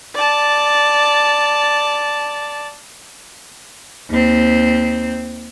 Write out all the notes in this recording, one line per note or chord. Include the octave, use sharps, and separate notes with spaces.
D5 A5
D#2 C4